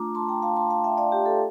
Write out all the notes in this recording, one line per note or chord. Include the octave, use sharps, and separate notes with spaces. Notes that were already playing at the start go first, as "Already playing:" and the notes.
Already playing: A3 D4 F4 A#5 D6
A5 C6
G5 A#5
F5 A5
A5 C6
F5 A5
E5 G5
D5 F5
G4
A4